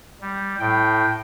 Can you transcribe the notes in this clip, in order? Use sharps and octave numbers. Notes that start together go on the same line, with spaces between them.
G3
A2 G5